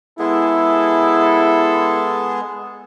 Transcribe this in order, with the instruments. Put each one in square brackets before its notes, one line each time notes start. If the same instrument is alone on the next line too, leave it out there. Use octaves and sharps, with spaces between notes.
[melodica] G#3 B3 G#4 [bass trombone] E4 [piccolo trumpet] A4